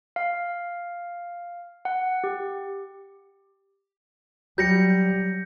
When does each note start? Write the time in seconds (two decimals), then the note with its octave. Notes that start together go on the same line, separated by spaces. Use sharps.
0.16 F5
1.85 F#5
2.24 G4
4.58 F#3 G3 G6 A#6 C#7